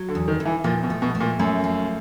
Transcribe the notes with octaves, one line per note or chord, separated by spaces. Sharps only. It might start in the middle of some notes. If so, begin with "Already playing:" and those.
Already playing: F#3
D3
E2
D#3
E2
E3
A#2 F3
B2
A3
B2
A3
A#2
F#2 A3
F3